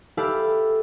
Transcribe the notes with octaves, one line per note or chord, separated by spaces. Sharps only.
E4 G4 A4 B4 F5 A5